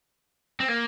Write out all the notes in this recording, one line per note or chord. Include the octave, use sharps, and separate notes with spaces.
C4
A#3